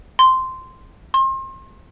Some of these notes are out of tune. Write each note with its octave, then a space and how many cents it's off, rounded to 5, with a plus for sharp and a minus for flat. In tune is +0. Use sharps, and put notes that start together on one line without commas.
C6 -10
C6 +35